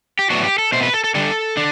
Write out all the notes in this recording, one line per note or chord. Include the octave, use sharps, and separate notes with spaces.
G4
A2 F#3 B3 D4 F#4
G4
A4
B2 A3 C4 C5
B4
A4
A4
D3 G3 D4 A4
D4